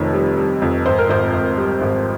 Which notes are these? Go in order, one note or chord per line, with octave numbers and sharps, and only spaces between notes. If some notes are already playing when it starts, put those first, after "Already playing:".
Already playing: F1 F2 D#3 C#5
G3
G3
F2
G#1 C5
A#4
G#1 C5
G#1
G3
G#1